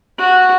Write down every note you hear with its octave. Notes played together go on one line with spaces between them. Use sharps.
F#4